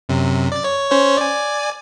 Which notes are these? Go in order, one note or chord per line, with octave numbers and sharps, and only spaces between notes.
F#2 C3
D5 A6
C#5
C#4 C5 C#5
D5 G#5